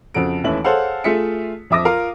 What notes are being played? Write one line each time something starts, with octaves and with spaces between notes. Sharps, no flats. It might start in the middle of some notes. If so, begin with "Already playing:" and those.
F2 C#3 F#4 A4 D7
D#2 E3 A3 C#4 E5 F#7
G#4 A4 C5 C#5 F5 F#5
A3 F4 G#4 E5 B6 C#7
F2 F3 E5 D6 D#6 A#6
F4 A#4 F5